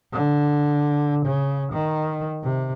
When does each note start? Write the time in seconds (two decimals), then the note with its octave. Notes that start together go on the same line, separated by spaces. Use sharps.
0.13 D3
1.26 C#3
1.72 D#3
2.43 C3